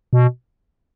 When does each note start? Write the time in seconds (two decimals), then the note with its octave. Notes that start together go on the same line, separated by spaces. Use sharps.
0.13 B2